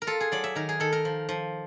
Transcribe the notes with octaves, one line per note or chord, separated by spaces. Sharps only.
A#4
F4 A4
G#4
F#3 D5
E5
D#3 A#4
G#4
D#3 A4
A#4
F3
F3